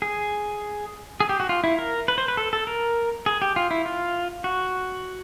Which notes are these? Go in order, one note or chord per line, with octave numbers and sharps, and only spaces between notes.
G#4
G#4
G4
F#4
F4
E4
A#4
B4
C5
B4
A4
A4
A#4
G#4
G4
F4
E4
F4
F#4